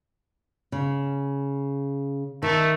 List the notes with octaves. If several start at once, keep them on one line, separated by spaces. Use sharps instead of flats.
C#3
D#3 A3